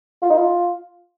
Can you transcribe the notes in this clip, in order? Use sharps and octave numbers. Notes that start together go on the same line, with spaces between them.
F4
D#4
F4